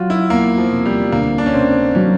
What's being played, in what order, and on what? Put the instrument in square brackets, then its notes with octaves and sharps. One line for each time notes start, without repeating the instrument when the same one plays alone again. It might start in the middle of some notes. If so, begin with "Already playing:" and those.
Already playing: [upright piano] F#3 [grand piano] F4 F#4
[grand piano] E4
[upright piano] E2 [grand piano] A#3
[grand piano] F3
[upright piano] C3
[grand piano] G3
[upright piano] D2 [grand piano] A#3
[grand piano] D4
C#4
[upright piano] C3 [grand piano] C4
[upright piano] F#3 [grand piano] C#4